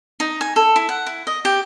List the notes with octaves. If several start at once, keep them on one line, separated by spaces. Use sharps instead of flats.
D#4
G#5
A4
E4
F#5
E4
D#5
G4